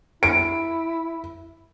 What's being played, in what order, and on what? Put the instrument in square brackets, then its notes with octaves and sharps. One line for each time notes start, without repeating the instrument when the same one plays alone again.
[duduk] E4 [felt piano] D7